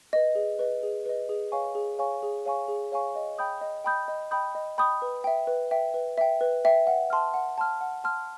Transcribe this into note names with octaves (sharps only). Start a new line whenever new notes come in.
B4 D#5
G#4
B4 D#5
G#4
B4 D#5
G#4
C#5 F5 G#5 C#6
G#4
C#5 F5 G#5 C#6
G#4
C#5 F5 G#5 C#6
G#4
C#5 F5 G#5 C#6
D#5
G5 B5 D#6 G6
D#5
G5 B5 D#6 G6
D#5
G5 B5 D#6 G6
D#5
G5 B5 D#6 G6
B4
E5 G5
B4
E5 G5
B4
E5 G5
B4
E5 G5
F#5
A5 C6 F6
F#5
A5 C6 F6
F#5
A5 C6 F6